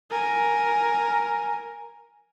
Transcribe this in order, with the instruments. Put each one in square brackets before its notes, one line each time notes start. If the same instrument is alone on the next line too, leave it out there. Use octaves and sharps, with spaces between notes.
[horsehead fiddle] A#4 G#5